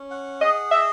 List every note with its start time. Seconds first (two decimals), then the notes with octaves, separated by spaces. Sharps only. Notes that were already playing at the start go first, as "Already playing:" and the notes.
Already playing: C#4
0.11 F#5
0.41 G#4 D#5
0.71 D#5 E5